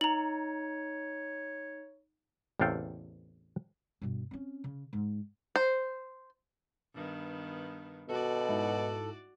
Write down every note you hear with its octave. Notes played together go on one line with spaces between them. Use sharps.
D#4 C#5 A#5 F#7
A1 E2 C3 A4 F5 G5
G2 B2
C4 C#4
C#3
G#2
C5
G2 D#3 B3
B2 F#4 A4 D5
G#2 D#4 E4